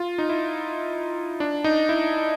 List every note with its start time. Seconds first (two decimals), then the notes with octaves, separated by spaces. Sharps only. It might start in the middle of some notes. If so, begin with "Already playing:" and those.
Already playing: F4
0.18 D#4
0.29 E4
1.40 D4
1.64 D#4
1.89 E4